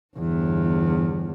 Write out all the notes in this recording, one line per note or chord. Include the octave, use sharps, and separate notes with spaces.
G1 E2